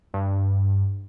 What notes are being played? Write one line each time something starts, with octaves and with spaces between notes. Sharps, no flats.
G2